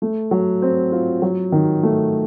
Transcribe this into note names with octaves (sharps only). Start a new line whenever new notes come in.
A3
F#3
C4
F4
F#3
D#3
A3